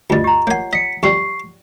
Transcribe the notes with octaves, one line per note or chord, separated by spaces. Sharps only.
D2 G2 F4 D#5
G4 A#5
A#3 C#5 F#5 G#5
D#5 B6 C#7
F2 G3 C#6 C7